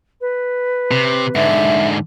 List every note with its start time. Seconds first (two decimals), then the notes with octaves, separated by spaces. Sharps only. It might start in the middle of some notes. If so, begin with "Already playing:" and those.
0.21 B4
0.91 C3
1.35 G#2 D3 E5